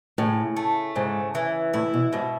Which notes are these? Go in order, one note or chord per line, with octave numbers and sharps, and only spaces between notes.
A2 C#3
A3
G#2 C#3
E3
A2 E4
B2
G#2 B2